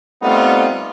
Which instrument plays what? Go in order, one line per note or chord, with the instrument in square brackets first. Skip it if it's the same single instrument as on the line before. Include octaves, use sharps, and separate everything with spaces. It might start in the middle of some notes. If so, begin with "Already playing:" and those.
[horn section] G3 A3 B3 C4 D#4 F4